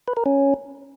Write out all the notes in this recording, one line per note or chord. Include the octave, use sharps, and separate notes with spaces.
B4
A#4
C#4